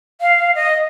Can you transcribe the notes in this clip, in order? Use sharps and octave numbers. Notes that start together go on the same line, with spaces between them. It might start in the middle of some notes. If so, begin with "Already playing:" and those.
F5
D#5